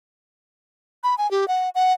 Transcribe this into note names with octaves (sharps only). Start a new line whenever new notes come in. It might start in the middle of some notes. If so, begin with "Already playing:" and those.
B5
G#5
G4
F#5
F#5